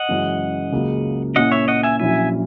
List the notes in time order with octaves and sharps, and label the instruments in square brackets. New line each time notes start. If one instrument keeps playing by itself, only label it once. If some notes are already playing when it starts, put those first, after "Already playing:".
Already playing: [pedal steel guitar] D#5 F#5
[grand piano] F#1 F#2 E3 G#3 C#4
C#2 C#3 F#3 A#3
[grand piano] A#2 A#3 C#4 E4 [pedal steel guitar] D#5 F#5
[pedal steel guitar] C#5 E5
D#5 F#5
E5 G#5
[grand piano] A#1 A#2 F#3 C#4 E4 [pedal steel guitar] E5 G#5